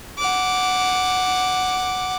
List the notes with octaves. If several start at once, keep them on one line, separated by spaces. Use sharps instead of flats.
F#5 D6